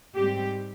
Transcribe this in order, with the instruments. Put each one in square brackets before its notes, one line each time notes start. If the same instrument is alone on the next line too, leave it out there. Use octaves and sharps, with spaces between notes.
[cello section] G#2 G3 C4 G4